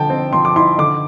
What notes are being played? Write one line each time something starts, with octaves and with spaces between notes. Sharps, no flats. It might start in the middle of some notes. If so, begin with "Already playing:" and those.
Already playing: D3 F3 G5 A5
C4
F3 C6
D6
E4 C6
D3 D6